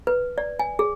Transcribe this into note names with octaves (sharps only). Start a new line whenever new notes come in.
B4
D5
G#5
G#4